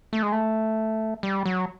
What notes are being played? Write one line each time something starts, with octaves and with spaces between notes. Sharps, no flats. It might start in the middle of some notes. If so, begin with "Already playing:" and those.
A3
G#3
A3
G3
F#3